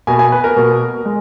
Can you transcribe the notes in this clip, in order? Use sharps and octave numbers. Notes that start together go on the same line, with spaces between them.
B2 A#3 G#5
G#5
B4
A#4
B2 A#3
G#3